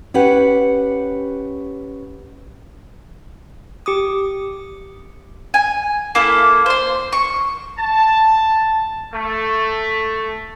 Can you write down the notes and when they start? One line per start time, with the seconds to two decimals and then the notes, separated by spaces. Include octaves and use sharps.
0.14 C#4 G4 B4 F#5
3.86 G4 D6 D#6
5.54 G#5
6.15 A#3 E4 A4
6.66 C5 C6
7.12 C#6
7.79 A5
9.13 A3